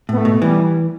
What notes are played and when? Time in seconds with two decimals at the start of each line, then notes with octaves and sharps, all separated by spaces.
0.09 A2 B3
0.17 A3
0.25 B2
0.42 E3 G3